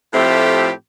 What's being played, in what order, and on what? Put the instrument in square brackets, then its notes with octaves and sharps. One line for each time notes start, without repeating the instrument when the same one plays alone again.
[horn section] A2 F3 A3 C4 G4